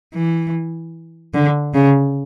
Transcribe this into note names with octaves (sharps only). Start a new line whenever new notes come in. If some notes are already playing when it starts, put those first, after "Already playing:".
E3
D3
C#3